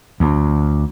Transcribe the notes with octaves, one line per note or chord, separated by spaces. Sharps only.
D2